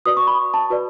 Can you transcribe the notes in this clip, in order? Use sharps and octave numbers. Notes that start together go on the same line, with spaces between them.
F#4 B4 D5 D#6
C#6
B5
A5
F#4 B4 D5